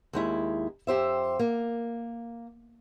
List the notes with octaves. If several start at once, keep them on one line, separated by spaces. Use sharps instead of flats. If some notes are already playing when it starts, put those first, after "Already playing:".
D#2 G#3 E4
F2 G4 C5 E5
A#3